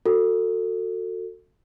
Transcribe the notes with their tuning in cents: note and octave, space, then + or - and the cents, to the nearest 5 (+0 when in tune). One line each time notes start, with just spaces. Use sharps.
F#4 -15 A4 +25